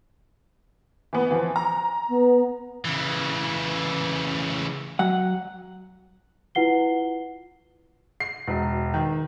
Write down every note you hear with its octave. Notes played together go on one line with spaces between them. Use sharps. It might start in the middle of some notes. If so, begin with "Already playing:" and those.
E3 B3
E3 F3
A#5
B3
C#3 E3
F#3 F#5
E4 F4 B4 F#5 C7 G7
C7
E1
D#3